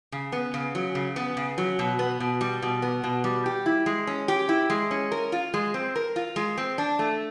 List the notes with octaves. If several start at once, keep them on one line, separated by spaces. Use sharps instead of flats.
C#3
B3
C#3
F#3
C#3
B3
C#3
F#3
B2
B3
B2
G3
B2
B3
B2
G3
G4
E4
G#3
C#4
G4
E4
G#3
C#4
A#4
F4
G#3
C4
A#4
F4
G#3
C4
D4
A3